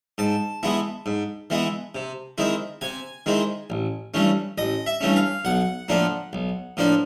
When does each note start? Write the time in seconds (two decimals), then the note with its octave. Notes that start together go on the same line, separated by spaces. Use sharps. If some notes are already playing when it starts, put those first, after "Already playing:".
0.18 G#2 A5
0.63 E3 G#3 B3 E4
1.06 G#2
1.50 E3 G#3 B3 E4
1.95 C3
2.38 D#3 G#3 C4 E4
2.81 C3 G#5
3.26 D#3 G#3 C4 E4
3.70 A1
4.14 G2 E3 A3 C#4
4.58 A1 D#5
4.86 E5
5.01 G2 E3 A3 C#4
5.16 F5
5.45 B1 F#5
5.88 A2 F3 A#3 D4
6.33 B1
6.77 A2 F3 A#3 D4